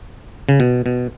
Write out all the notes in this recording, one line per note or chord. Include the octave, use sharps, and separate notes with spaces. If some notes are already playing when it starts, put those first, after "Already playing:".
C#3
B2
B2